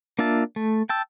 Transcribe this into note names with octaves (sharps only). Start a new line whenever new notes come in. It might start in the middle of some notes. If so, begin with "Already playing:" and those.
A#3 D4 F4 E5 A5
A3
G5 A5 E6